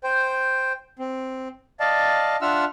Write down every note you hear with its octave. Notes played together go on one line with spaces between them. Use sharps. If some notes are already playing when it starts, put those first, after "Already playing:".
C5 G5
C4
D5 D#5 F5 A5
D4 F4 E5 F#5 E6 F6